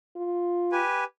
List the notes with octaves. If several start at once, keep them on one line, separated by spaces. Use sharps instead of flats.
F4
G4 B4 G#5